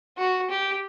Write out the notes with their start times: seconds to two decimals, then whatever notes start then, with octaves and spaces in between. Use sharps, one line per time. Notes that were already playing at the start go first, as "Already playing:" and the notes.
0.18 F#4
0.50 G4